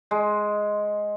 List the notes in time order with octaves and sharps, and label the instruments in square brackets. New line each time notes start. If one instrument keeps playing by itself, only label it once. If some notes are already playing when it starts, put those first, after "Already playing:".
[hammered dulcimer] G#3